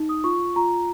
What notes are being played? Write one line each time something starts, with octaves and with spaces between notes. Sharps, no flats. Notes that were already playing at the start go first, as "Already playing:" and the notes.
Already playing: D#4
D#6
F4 C#6
F4 A#5